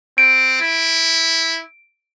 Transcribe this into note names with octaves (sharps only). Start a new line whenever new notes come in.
C4 D7
E4